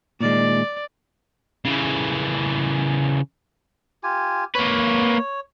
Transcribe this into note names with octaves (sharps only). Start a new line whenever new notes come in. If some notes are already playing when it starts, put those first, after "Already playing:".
A#2 D#3 G#3 D5
C#3 E3
F4 G4 G#5
A#3 B4 C#5